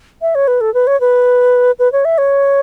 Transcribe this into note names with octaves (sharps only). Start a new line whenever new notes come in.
E5
C#5
B4
A4
B4
C#5
B4
B4
C#5
E5
C#5